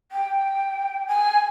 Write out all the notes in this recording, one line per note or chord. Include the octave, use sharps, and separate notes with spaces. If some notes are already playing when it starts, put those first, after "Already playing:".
G5
G#5